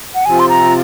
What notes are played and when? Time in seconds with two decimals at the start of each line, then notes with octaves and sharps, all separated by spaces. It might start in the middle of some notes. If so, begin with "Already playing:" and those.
0.15 F#5
0.25 C3 F3 C4 F4 G#5
0.39 C6
0.49 A#5